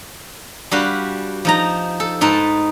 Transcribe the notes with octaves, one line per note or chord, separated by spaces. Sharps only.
G3 D4 F#4 G4 B4 F5
F3 D#4 A#5
A4
G#2 D#4 B4 A5